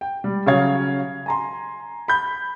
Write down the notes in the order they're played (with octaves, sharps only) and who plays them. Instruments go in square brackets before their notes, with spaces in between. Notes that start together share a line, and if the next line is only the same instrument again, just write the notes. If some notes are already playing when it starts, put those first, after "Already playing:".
[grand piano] G5
G3
C#3 F#3 C#5 F5 G#6
G#5 A#5 C6
B5 G6